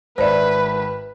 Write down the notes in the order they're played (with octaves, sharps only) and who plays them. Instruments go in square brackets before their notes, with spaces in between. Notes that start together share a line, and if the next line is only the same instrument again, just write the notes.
[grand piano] G#1 E5 [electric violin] B4 [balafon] C5 D5